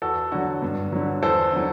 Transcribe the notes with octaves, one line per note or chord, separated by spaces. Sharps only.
E2 F#4 A4
D3 F#3 F#4
G2
D3 F#3
E2 A4 C5
D3 F#3